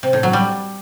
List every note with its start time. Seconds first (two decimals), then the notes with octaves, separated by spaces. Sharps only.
0.03 C3
0.13 A2
0.23 F#3
0.33 G3